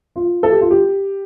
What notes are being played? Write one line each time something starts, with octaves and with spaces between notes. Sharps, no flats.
F4
A4
G4
F4
G4